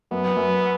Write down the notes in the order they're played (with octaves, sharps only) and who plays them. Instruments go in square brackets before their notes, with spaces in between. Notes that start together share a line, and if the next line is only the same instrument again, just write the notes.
[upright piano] F#2 [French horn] B3
[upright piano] F#2